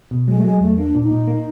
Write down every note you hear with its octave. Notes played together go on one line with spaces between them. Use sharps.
B2
F#3 G#3
A3
F#3 G#3
E2 A3
A#3 D4
A#2
D#4
A#2
A#3